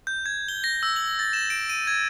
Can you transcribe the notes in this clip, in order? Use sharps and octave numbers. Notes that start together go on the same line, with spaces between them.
G6
G#6
G7
A#6
E6
F#7
A6
E7
D7
D#7
G#6